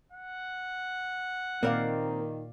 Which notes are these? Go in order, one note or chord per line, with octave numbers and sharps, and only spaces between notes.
F#5
A#2 D#3 A#3 C4 A#4 D5 F5